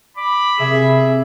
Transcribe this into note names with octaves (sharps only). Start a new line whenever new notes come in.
B5 D6
C3 G#4 E5